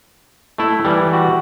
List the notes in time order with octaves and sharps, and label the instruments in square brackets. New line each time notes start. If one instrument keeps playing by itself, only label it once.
[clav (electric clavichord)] A3 E4
E3 G3
[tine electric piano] F#4 G4